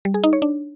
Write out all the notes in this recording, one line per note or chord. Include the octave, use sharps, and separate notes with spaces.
G3
G#4
D#4
C#5
D4